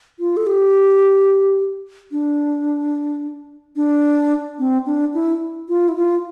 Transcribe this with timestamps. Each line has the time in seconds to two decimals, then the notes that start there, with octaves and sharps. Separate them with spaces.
0.20 F4
0.37 A4
0.47 G4
2.12 D4
3.76 D4
4.59 C4
4.86 D4
5.14 E4
5.69 F4
5.89 E4
5.96 F4